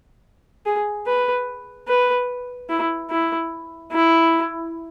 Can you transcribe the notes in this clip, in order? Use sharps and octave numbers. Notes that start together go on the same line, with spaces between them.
G#4
B4
B4
E4
E4
E4